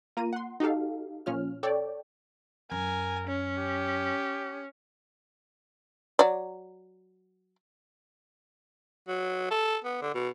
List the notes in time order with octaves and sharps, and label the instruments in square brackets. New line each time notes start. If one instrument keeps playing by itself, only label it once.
[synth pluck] A#3 F4 A#5 D#7
F#5 C6
D#4 F#4 G4 A4 F5
A#2 F3 C#4 F4 F6
A4 C#5 D5 G5
[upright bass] F#2 [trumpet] A#4 [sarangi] G#5
[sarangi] C#4
[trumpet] G4
[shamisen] F#3 D5
[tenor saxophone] F#3
A4
B3
D3
B2